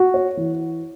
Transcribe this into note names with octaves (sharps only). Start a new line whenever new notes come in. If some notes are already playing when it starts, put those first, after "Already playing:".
Already playing: F#4
C#5
E3